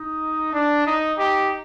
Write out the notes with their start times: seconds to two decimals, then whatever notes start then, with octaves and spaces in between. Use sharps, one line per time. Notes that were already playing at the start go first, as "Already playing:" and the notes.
Already playing: D#4
0.52 D4
0.85 D#4
1.16 D#4 G4